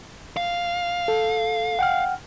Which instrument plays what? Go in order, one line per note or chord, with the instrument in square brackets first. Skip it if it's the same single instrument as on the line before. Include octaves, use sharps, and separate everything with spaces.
[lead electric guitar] F5
[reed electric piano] A4
F#5 G5 F6